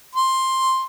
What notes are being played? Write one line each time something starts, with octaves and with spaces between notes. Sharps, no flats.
C6